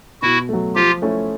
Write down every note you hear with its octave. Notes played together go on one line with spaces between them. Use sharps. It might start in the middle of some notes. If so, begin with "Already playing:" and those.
B2 E4 F#4
F#3 A3
F3 F4 G4
A3 C#4 E4